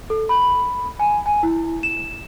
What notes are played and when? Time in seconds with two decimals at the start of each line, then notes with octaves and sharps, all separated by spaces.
0.10 A4
0.29 B5
0.99 G#5
1.26 G#5
1.43 E4
1.83 E7